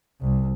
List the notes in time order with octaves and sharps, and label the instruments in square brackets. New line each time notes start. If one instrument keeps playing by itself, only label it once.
[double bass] C2